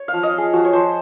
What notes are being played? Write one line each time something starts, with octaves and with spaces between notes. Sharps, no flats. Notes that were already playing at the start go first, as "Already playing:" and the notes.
Already playing: C#5
F5
F3
D#5
F4 G#4
F3 F#4
C#5
F3 C5